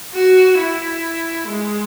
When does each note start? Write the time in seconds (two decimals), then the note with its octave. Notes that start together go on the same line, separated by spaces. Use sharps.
0.14 F#4
0.59 E4
1.49 G#3